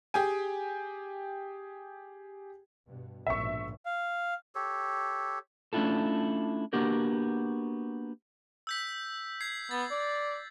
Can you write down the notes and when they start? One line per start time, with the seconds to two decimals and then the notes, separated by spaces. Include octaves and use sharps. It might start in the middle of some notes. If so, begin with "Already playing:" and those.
0.14 G4 G#4 G5 G#5
2.86 G2 B2
3.27 A#1 G#2 B2 E5 C#6
3.86 F5
4.55 G4 A4 C#5
5.73 A3 C#4 D4 E4 F4 A4
6.73 A#3 B3 D4 F#4 G4 A#4
8.67 E6 G6 B6
9.41 G#6 C7
9.71 B3 A6
9.91 D5